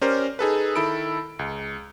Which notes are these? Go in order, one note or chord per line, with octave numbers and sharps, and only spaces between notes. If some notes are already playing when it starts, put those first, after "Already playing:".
C#4 G4 A#4 C5 D5
D#4 G#4 A4 B4
D#3 E4 A4 B5 D7
C#2